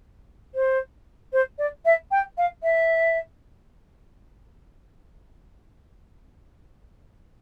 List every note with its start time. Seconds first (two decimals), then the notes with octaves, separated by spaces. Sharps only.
0.55 C5
1.33 C5
1.59 D5
1.85 E5
2.11 G5
2.38 F5
2.63 E5